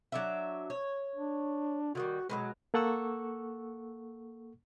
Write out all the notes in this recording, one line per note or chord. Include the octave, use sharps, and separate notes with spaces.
F#3 D4 E5
C#5
D4
D3 D#3 G3 F#4
B2 D3 F#3 G#3
A#3 A4 F#5 C#6 E6